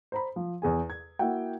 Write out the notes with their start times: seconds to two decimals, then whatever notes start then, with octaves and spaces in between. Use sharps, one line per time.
0.12 C5 A#5 B5
0.36 F3
0.62 E2 G#4 G#5
0.90 G#6
1.19 A#3 E4 F#4 F#5 G5